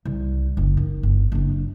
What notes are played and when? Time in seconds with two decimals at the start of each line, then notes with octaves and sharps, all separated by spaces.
0.05 C2
0.57 F#1
0.77 D#3
1.03 G1
1.32 F#1 D4